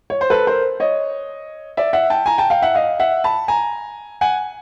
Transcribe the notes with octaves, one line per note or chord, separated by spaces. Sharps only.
C#5
C5
A4 B4
A#4 C5
C#5 D#5
D5 E5
E5 F#5
G5 A5
G#5 A#5
G5 A5
F5 G5
E5 F#5
D#5 F5
E5 F#5
A5 B5
G#5 A#5
F#5 G#5